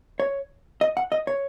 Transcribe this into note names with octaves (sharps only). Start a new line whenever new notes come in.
C#5
D#5
F#5
D#5
C#5